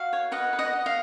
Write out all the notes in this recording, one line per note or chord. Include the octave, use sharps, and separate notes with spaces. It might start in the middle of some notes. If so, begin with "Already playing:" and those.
Already playing: F#4 F5
C#5
B4 D#5 F#5
B4
D#5 F#5
D#5
F5